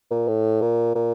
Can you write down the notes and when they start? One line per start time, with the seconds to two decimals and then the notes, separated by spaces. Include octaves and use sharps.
0.11 A#2
0.28 A2
0.62 A#2
0.96 A#2